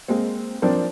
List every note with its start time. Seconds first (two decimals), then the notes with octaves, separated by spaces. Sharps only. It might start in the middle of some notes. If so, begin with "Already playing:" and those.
0.08 G#3 A#3 C4
0.62 F3 C4 D4 A#4 C5